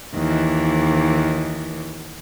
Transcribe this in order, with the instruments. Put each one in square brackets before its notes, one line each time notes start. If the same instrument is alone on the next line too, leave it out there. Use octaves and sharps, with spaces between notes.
[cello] D#2 E3